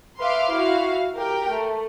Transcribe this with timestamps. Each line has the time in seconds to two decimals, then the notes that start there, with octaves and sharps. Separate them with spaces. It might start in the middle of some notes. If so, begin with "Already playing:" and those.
0.20 B4 E5 F5 C6 D6 F6
0.50 E4 F#4 F5
1.15 G4 A#4 G5
1.50 A3